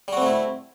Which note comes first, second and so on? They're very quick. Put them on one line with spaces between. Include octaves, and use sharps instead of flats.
G3 F#4 C4 A3 E4